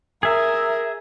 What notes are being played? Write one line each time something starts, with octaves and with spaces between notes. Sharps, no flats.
G#4 A#4 E5